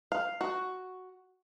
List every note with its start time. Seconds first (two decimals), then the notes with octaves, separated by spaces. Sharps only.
0.12 F5
0.41 F#4